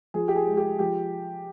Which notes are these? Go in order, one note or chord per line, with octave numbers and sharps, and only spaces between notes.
F3 G#4
G4
G#4
G#3
G4
F3 G4